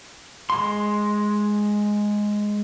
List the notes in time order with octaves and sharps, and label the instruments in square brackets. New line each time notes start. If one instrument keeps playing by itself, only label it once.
[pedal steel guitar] G#3 C6